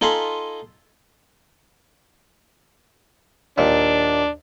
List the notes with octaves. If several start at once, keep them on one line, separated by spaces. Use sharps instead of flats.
D#4 F4 A4 G#5 B5 C6
D#2 A#2 D4